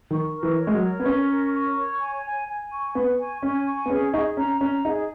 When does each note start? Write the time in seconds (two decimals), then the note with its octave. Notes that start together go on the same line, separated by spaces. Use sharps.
0.10 D#3 C#6
0.34 A#4
0.43 E3
0.58 C#5
0.67 G#3
0.74 F#3
0.82 A#4
1.00 B3
1.05 C#4 C#6
1.29 A#4
1.53 C#6
1.77 C#5
2.00 G#5
2.24 G#5
2.48 G#5
2.71 C#6
2.95 B3 C#6
3.19 G#5
3.42 C#4 G#5
3.67 C#6
3.86 B3
3.90 C#4 G#4
4.14 D#4 G#4
4.37 C#4 A#5
4.61 C#4 A#5
4.85 D#4 G#4